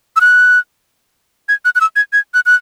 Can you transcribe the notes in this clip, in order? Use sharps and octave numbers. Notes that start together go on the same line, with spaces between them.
E6
F#6
G#6
F#6
F#6
E6
G#6
G#6
F#6
F#6